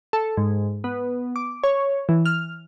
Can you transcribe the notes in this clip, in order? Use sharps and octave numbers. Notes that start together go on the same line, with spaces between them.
A4
G#2
B3
D6
C#5
E3
F6